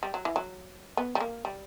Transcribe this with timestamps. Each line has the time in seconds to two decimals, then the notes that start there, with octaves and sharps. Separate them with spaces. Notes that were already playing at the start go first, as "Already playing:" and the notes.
0.03 G3
0.14 F#3
0.25 E3
0.36 F#3
0.97 B3
1.15 G3
1.20 A#3
1.45 G3